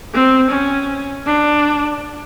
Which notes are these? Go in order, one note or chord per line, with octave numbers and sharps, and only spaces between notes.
C4
C#4
D4